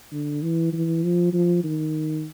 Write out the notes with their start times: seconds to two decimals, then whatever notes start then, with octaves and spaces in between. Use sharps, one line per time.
0.12 D3
0.42 E3
0.73 E3
1.03 F3
1.33 F3
1.63 D#3